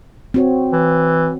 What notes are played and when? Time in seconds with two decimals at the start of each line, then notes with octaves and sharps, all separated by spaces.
0.34 C4 F#4 C#5
0.73 E3